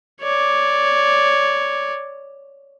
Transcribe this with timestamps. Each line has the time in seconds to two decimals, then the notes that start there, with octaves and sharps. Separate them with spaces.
0.21 C#5 D5